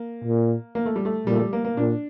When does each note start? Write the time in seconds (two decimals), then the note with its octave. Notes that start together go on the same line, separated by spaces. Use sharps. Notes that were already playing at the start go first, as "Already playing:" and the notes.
Already playing: A#3
0.24 A#2
0.75 A#3
0.86 A3
0.96 G3
1.05 A3
1.27 A#2 G3
1.34 A3
1.39 G3
1.53 A#3
1.65 A#3
1.77 A#2 D4